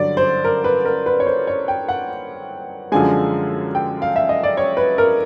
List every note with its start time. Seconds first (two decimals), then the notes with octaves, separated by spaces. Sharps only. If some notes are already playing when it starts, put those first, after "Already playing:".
Already playing: G2 D3 F#3 D5
0.17 C5
0.44 A#4
0.64 B4
0.85 A#4
1.06 B4
1.20 C#5
1.27 C5
1.47 C#5
1.68 G5
1.89 F#5
2.92 F#2 D3 F3 G#3 G#5
3.75 G5
4.02 F5
4.16 E5
4.29 D#5
4.43 D5
4.57 C#5
4.77 B4
4.98 A#4